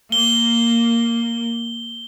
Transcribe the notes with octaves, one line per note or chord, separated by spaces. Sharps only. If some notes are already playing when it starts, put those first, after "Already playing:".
A#3 G7